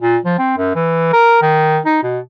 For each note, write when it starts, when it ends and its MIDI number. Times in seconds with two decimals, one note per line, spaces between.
0.02 0.18 46
0.25 0.35 53
0.39 0.55 60
0.58 0.74 42
0.76 1.09 52
1.13 1.40 70
1.42 1.79 51
1.86 2.01 63
2.03 2.19 47